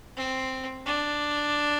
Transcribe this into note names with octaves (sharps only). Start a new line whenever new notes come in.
C4
D4